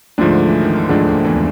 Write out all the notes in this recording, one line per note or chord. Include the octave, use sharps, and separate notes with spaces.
D2 G#2 D3 F3 A3 D4
E3
D#3
D3
C#2 G#2 C#3 F3 A3 D4
D#2 D#3
E2 E3